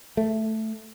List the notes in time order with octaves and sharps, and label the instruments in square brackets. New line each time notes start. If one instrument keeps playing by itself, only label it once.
[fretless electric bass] A3